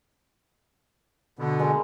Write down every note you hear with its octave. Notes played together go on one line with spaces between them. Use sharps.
B2 D3 B3
G#3 A#4